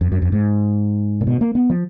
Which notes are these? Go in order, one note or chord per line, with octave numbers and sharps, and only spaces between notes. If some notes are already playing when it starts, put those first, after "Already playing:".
F2
F#2
F2
G#2
A#2
B2
A#3
B3
F3